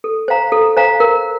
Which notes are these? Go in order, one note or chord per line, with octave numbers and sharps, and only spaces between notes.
A4
C5 F5 A#5
A4
C5 F5 A#5
A#4